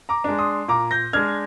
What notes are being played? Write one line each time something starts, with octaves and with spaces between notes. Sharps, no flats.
A#5 D6
G#3 D4
C6 D#6
A#2 A#5 D6
G6 A#6
G#3 D4 F6 G#6